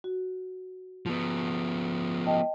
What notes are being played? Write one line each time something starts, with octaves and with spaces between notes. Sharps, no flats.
F#4
F3 B3
D#5 G5 A5